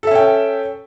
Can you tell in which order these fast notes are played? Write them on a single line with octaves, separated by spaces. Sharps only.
A4 E5 C#4 G5